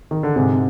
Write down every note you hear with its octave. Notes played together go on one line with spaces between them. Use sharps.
D#3
D3
G#2 C3